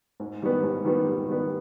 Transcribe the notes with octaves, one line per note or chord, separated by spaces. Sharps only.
G#2
D#3 G3 B3
G#2
D#3 G3 B3
G#2
D#3 G3 B3